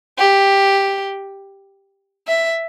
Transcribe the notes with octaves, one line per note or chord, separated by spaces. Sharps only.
G4
E5